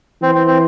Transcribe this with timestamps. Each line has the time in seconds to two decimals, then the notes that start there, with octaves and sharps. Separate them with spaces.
0.22 E3 C4
0.35 C4
0.47 C4